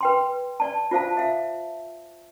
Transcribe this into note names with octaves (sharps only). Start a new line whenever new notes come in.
B4 G5 C6
D5 A5
F4 C5 F5 A5
E5 F5